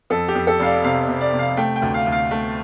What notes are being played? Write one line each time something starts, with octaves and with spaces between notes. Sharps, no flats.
F2 A4
G4
F2
A4
F1 F5
D5
C3 F5
C3
D5
C3
F5
A3 G5
G5
D2
F5
D2
F5
A3